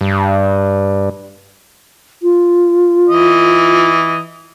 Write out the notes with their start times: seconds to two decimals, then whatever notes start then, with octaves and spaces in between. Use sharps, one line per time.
0.01 G2
2.23 F4
3.09 E3 D#5